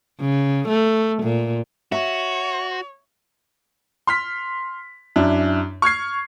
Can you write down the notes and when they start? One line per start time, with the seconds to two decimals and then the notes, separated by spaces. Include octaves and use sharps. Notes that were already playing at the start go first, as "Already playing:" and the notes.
0.20 C#3
0.69 A3
1.23 A#2
1.92 F#4 C#5 E5
4.07 C6 F6 B6
5.16 F#2 D4 E4
5.82 C#6 F6 G#6 C7